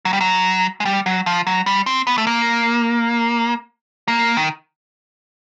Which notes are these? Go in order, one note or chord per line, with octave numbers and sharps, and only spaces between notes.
F#3
G3
F#3
G#3
G3
F#3
F3
F#3
G3
C4
B3
A3
A#3
A#3
D#3